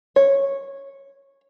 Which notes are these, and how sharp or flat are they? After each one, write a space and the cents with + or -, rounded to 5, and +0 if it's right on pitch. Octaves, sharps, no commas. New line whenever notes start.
C#5 -10